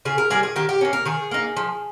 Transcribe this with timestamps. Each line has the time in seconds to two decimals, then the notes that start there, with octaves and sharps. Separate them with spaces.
0.05 C#3 G#4
0.18 A#4
0.30 G3 A#3 G#4
0.43 G#4
0.56 D#3 G4
0.69 G4
0.81 A#3 C#4
0.93 A#4
1.06 D#3 G#4
1.31 A#3 D#4
1.57 F3